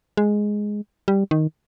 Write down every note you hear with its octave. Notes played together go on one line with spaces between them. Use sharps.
G#3
G3
D#3